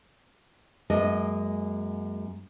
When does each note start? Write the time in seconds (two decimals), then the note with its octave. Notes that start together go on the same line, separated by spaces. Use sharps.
0.90 F#2 G#3 A#3 D#5